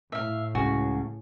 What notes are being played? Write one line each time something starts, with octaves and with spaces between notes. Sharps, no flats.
A2 E5 F5
C#2 C#3 F#4 G#5